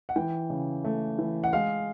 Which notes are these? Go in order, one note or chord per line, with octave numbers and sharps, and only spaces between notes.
F#5
E3 G5
C#3
A3
E3
F#5
G#3 F5